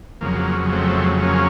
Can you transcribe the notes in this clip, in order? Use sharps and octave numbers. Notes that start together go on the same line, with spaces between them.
F2 C#3 F#3 A#3
A3 C4
A#3 C#4